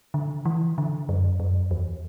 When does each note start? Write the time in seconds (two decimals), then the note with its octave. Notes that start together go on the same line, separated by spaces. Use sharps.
0.14 D3
0.45 E3
0.78 D3
1.09 F#2
1.40 F#2
1.71 E2